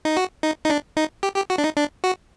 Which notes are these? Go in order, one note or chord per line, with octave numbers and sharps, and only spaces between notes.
D#4
F#4
D#4
D#4
D4
D#4
G4
G4
F#4
D4
D#4
D4
F#4